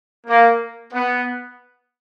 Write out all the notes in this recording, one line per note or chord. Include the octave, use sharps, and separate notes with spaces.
A#3
B3